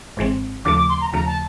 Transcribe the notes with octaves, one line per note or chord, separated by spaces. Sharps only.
G#1 G#2 E3 G#3 C4
D#2 C#3 F3 A3 D6
D6
C6
A#5
D#2 C#3 F3 A3 A#5
A5